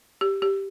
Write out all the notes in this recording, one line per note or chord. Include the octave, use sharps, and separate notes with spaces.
G4
G4